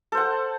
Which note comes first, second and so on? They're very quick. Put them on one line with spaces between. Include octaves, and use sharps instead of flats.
A4 C5 F#5